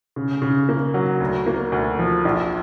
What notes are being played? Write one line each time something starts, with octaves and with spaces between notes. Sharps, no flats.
C#3
C#3
A#3
F#3
D2
A#3
D2
F3
A#1